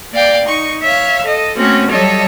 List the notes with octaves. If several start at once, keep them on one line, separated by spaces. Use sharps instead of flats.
A#3 D5 F5 G5
D#4 C#6
C#5 E5 F5
A4 D#5
A3 A#3 C4 C#4 F#4
F#3 G3 A4 C#5 D#5 E5